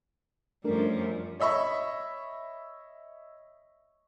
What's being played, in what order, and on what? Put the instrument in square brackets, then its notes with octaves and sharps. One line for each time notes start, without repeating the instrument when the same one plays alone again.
[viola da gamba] F#2 F3 G3 [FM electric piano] A3 D4 A#4
[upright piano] C#5 D#5 E5 B5 C#6